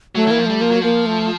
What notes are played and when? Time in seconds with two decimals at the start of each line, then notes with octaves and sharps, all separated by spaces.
0.15 F#3 A3
0.27 E3 A#3
0.38 F3
0.46 G3 A3
0.61 F3 A#3
0.71 F#3
0.82 F3 A#3
1.06 A3